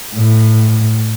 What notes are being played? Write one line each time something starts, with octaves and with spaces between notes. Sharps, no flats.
A2